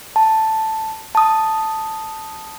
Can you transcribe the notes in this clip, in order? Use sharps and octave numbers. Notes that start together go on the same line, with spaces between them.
A5
A5 D#6